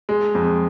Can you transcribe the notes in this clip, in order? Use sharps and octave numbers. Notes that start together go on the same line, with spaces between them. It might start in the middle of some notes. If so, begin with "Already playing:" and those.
G#3
F2